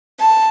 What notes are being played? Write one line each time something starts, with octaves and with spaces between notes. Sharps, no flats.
A5